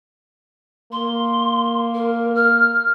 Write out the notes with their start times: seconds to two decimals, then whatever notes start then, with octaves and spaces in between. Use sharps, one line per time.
0.92 A#3 C6
1.94 A#4
2.35 F6